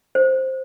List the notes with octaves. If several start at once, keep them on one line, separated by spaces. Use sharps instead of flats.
C5